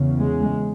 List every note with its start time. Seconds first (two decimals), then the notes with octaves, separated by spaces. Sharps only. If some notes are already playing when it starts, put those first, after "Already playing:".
Already playing: E2 C#3
0.21 G#3